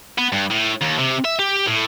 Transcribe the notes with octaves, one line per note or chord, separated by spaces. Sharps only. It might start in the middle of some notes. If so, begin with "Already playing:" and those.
B3
G2
A2
D#2
C3
E5
G4
A2